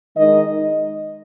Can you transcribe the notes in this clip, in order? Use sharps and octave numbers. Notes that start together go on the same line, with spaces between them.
D#3 G#3 D#4 D#5